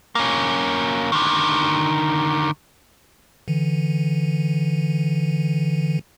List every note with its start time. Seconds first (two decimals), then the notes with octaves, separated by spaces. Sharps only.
0.15 A#3 C#4
1.12 D3 D#3
3.48 D3 E3